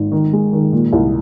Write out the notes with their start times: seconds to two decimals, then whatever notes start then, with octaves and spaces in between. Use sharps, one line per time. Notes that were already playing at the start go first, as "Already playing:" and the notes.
Already playing: G#1
0.12 D#3
0.33 G#3
0.53 D#3
0.72 A#2
0.93 C2